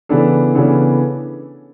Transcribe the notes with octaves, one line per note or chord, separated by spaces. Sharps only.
C#3 E3 B3 D4 A4
C#3 E3 B3 D4 A4